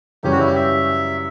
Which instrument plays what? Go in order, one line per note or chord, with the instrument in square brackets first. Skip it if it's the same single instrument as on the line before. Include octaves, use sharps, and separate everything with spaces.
[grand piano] F#2 C#3 E3 G3 C#4 [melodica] G4
[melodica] F#4
E4
G4
E5